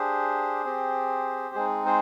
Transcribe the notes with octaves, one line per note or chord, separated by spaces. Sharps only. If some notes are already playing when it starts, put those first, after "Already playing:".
Already playing: D4 G4 G#4 C5
C4 G4
G#3 C4 D#4 G#4
G#4 C5